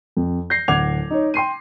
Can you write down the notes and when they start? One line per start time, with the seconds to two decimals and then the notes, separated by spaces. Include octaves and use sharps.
0.17 F2
0.50 G6 A#6 C7
0.68 D1 F#5 D6 G#6 F7
1.10 D#4 C#5
1.34 G5 C6 C7 D#7